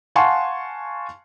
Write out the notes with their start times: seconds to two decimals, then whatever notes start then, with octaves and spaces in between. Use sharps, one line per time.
0.15 F5 F#5 G#5 A5 C6 C#6